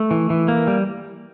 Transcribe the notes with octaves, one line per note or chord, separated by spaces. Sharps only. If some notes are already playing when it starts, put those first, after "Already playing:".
Already playing: A3
E3
E3
A#3
G3